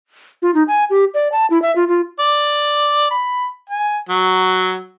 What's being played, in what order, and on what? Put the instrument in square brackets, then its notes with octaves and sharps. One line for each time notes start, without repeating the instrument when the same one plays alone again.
[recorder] F4
D#4
G#5
G4
D5
A5
E4
E5
F4
F4
[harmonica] D5
B5
G#5
F#3